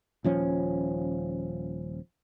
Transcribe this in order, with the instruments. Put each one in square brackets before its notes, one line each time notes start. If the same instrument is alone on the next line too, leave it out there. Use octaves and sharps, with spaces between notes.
[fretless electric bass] D#1 F3 C#4